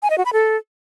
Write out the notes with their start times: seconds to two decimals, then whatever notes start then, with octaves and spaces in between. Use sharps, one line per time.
0.03 G#5
0.10 D#5
0.18 F#4
0.25 B5
0.33 A4